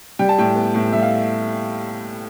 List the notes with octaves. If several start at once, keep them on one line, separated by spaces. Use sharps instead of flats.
G3 G5
A5
A2 G5
B3
A2
G3 E5
F5